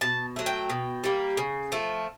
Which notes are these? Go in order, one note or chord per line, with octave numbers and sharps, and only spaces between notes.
B2 A5
F#3 A3
G5
B2
G3 A#3
C#3
F3 A3